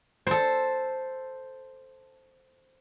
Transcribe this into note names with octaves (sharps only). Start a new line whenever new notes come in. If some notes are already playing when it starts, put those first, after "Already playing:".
A4 C5